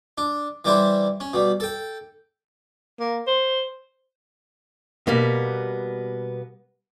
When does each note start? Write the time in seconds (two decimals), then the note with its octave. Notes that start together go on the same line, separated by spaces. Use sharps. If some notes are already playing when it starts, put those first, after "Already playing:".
0.18 D4
0.65 E3 G3 D4 E4 C5
1.20 C#4
1.33 B2 G3
1.60 A4 G5
3.00 A#3
3.27 C5
5.07 B2 G3 A#3 B3